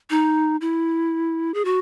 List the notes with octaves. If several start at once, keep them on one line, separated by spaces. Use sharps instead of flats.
D#4
E4
G#4
F#4